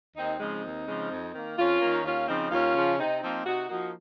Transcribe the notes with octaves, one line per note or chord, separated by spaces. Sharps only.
D#2 C4 D#4
C#3 F3 G#3 C4 D#4
D#2
C#3 F3 G#3
F2
D#3 A#3
F2 C#4 F4
D#3 A#3
D#4
D#2 C#4 F4
C#3 F3 C4 D#4
D#2 C#4 F4
C#3 F3
C3 C4 D#4
F3 A#3 C4 D#4
C3 D#4 F#4
F3 A#3 D#4 F#4